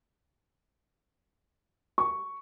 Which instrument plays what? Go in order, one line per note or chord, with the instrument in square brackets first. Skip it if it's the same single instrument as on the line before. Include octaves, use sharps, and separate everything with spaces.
[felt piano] C#6